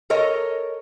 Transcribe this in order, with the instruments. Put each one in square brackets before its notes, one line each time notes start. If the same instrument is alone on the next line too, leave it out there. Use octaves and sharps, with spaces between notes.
[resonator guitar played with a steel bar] A4 A#4 C#5 D#5